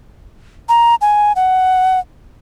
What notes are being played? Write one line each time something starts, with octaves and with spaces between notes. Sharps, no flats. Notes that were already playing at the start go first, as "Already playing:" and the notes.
A#5
G#5
F#5